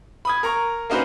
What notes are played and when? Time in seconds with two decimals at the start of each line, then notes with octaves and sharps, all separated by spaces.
0.25 B5 D#6 G#6
0.43 A#4 A#5 C#6
0.90 A#3 C#4 D#4 F#4 B4 C5